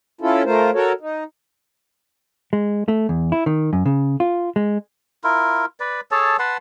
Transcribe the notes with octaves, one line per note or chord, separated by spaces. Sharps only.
C#4 E4 F4 A4
A3 F4 A#4 C5
F#4 A4 A#4 C#5
D#4
G#3
A3
E2
E4
D#3
F#2
C#3
F4
G#3
E4 F4 A#4
B4 D5
G#4 A4 C#5 A5
B4 F#5 A5 C6